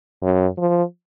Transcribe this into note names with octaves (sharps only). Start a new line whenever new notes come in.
F#2
F3